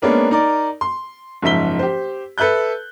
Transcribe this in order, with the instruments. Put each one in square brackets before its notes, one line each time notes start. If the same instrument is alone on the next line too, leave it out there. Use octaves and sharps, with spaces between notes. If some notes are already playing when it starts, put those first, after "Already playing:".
[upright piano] G#3 A#3 B3 C#4 D4 A#4
D#4 A#4 D5
C6
F#1 G#2 F3 E5 B6 G7
G4 C5
A4 B4 E5 F#6 G6